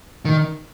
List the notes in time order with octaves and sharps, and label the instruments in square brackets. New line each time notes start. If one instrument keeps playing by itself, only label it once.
[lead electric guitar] D#3